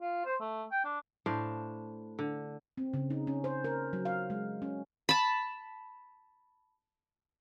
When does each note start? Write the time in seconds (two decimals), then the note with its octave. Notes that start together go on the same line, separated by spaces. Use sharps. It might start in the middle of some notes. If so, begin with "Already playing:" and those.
0.01 F4
0.25 C5
0.40 A3
0.72 G5
0.85 D4
1.26 A2 D4 C5 F5
2.19 D3
2.77 C4
2.94 C#3
3.10 D#4
3.27 C#4
3.44 C5
3.64 A#4
3.93 F#3
4.05 F5
4.30 G#3
4.62 C#4
5.09 A5 B5